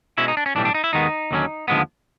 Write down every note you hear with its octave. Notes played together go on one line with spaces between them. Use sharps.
B2 G#3 C#4 E4
D#4
D4
C#4
B1 A2 E3 G3 D4
D4
D#4
E4
D#2 D#3 G#3 B3 D#4
D#2 D3 F#3 A#3 C#4
D#2 D3 F3 G#3 B3